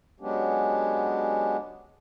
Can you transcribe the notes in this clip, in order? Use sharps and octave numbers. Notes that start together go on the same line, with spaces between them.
F#3 G#3 B3 C#4 D4 G4